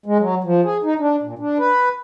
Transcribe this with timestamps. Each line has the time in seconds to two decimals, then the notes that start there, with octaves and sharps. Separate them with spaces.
0.06 G#3
0.19 F#3
0.44 F3
0.64 G#4
0.84 D#4
0.99 D4
1.23 A#2
1.39 D4
1.59 B4